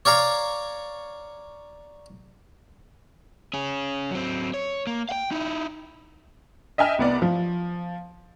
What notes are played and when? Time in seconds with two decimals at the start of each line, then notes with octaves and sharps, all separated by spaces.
0.05 C#5 D5 F5 A#5 C#6
3.54 C#4 G#4
4.11 F#3 C4
4.54 C#5
4.87 A#3
5.09 F5 G5
5.32 D#4 E4
6.78 D#5 E5 G5 G#5 F6
6.99 C2 B3 D5
7.22 F3